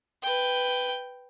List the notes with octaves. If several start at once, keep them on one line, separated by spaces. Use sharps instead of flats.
B4 G5